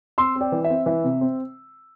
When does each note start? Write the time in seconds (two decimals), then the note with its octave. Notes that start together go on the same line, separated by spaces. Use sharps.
0.18 C4 C6 E6
0.35 C4
0.41 D5 G5
0.52 E3
0.64 E5
0.70 C4
0.86 E3 E5
1.04 C3
1.21 C4